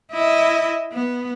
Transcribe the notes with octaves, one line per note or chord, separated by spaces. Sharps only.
E4 D#5
B3